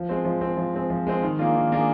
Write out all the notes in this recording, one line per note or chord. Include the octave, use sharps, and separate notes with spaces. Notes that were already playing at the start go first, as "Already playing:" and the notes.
Already playing: F3
G#3 C4
F3
G#3 C4
F3
G#3 C4
F3
G#3 C4
D#3
A#3 D4 F4 G#4
D#3
A#3 D4 F4 G#4